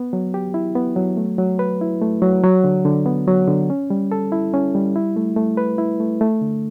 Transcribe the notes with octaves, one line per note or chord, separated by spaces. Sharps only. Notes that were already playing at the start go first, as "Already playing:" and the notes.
Already playing: B3
F#3
G4
E4
B3
F#3
A3
F#3
B4
E4
A3
F#3
F#3
D3
D3
B3
F#3
D3
C#4
G3
A4
E4
C#4
G3
E4
A3
A3
B4
E4
A3
A3
D3